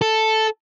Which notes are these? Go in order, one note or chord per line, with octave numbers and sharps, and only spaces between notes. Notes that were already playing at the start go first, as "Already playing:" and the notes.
A4